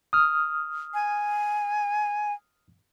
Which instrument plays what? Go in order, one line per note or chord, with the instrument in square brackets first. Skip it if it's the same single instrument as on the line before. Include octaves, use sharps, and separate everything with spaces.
[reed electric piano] D#6 F6
[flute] G#5